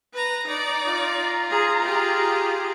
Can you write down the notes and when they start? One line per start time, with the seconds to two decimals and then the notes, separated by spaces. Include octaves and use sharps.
0.13 B4 A#5
0.47 D#4 D5 A#5
0.88 F4
1.50 G#4
1.82 G4 G#4